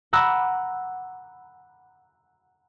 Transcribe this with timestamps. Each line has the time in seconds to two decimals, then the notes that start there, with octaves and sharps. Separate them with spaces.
0.13 F#5 A#5 B5 D6 E6 F#6